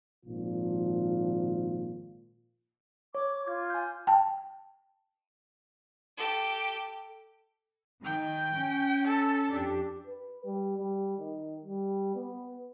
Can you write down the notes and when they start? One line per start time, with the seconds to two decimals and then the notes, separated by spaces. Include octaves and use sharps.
0.25 G#1 A#2 F3 F4
3.15 C#5 D6
3.46 F4 D6 G#6
3.70 G#5 G6
4.07 G5 A5
6.17 G4 A4
8.04 D#3 G5
8.56 C#4
9.07 A4
9.49 F2 D4 G4
10.07 B4
10.44 G3
10.77 G3
11.18 D#3
11.63 G3
12.15 B3